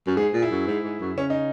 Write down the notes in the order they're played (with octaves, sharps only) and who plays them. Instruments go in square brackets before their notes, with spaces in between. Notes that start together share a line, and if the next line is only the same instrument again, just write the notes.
[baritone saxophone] F#2
[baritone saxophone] G#2 [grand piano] G#4
[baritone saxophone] A#2
[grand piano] E4
[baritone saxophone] F#2
G#2
G#2
F#2
[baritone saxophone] C#3 [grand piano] C#4
[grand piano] D#4